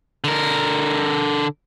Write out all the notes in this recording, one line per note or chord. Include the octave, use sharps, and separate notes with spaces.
D3 A#4